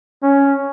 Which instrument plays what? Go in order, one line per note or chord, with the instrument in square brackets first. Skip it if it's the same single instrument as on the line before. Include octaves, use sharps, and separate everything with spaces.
[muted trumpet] C#4